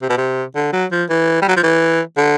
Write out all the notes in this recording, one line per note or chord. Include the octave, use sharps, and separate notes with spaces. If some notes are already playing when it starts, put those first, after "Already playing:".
C3
B2
C3
D3
F#3
F3
E3
G3
F#3
F3
E3
D3